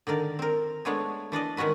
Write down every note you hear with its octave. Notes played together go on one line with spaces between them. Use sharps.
D3 D#3 A#4 D5
C4 A#4
G#3 A3 B3 D4 C#5
E3 D4 D5 D#5
D#3 G#3 C#4 F#4 B4